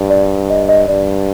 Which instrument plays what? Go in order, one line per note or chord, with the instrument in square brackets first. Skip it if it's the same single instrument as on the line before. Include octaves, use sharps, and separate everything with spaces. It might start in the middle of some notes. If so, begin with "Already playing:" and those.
Already playing: [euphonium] G2
[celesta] D5
D#5
D#5
[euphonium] G2 [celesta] D5